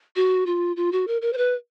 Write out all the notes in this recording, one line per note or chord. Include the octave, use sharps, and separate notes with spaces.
F#4
F4
F4
F#4
A#4
A#4
C5
B4